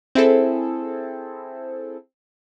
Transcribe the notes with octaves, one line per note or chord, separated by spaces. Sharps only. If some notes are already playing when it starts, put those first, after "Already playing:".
C4 E4 G#4 A4